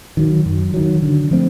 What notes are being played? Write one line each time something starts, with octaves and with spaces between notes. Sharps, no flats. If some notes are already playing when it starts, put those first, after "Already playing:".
D#3 F#3
F#2
D#3 F#3
D3
F3 A3 C4